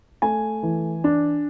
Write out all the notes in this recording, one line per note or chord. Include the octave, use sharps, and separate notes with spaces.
A3 G#5
E3
D4